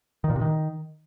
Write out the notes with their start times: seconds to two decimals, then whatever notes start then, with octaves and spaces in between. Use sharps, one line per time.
0.24 D#3
0.30 A#2
0.36 C3
0.41 D#3